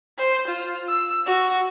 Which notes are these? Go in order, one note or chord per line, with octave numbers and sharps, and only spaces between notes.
C5
F4
E6
F#4